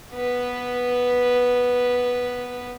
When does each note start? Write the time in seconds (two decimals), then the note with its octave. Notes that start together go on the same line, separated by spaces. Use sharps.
0.14 B3 B4